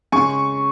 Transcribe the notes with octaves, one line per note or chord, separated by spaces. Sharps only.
C#3 G#3 G#5 C#6